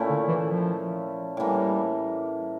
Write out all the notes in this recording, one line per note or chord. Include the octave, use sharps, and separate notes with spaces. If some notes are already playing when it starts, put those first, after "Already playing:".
Already playing: A#2 A3 C#4 E4
D3
E3
F3
A2 E3 G3 A#3